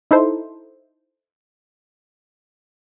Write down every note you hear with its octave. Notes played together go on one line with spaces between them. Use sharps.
D#4 E4 A4 C5